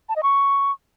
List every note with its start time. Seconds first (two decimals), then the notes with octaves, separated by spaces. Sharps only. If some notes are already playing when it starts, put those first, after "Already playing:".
0.09 A5
0.16 D#5
0.23 C#6